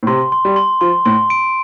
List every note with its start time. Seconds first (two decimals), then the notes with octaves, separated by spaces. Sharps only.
0.03 A2
0.07 C3 C6
0.32 C6
0.45 G3
0.56 C6
0.81 F3 C6
1.05 A2 C6
1.30 D7